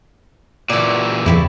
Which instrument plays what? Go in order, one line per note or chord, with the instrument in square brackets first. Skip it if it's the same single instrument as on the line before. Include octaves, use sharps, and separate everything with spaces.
[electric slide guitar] A#2 E3 [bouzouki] F#4 D5
[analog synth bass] F2 [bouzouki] C#3 G3 E4